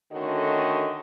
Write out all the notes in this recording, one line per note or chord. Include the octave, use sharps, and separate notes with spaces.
D3 D#3 A3 C#4 F#4 D#5